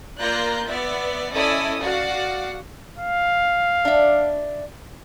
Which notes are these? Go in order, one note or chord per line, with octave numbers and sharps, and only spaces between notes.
A#3 F4 D5 A#5 F#6 G6
B3 D5 E5
C#4 E4 A4 D5 D#5 D#6
F#4 D5 F5 F#5
F5
D4 E5